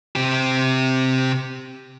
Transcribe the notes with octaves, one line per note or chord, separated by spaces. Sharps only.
C3 G4